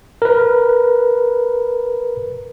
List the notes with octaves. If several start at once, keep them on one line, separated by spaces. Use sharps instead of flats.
A#4 B4